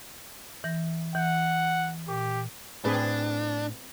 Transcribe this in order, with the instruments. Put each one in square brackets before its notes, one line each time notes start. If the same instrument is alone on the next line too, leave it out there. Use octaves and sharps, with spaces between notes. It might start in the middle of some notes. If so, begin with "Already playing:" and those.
[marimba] E3 A#6
[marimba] E3 [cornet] F#5
[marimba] A#2 [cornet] G4
[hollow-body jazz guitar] A2 [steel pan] C4 G#4 B4 [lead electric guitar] D4